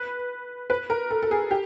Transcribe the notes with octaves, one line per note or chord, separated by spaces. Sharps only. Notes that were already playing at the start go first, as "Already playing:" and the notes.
Already playing: B4
B4
A#4
A4
A4
G#4
G4